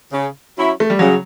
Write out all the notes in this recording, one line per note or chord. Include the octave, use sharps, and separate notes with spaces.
C#3
F#3 C#4 E4
A3
G3
C#3 F#3